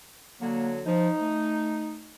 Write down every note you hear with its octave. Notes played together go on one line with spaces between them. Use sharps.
D3 F#3 A#3
F3 D#4
A3